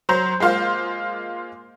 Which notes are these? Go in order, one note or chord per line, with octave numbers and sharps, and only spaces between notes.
F#3 C5 A#5 G6
G#3 A#3 F4 C5 F5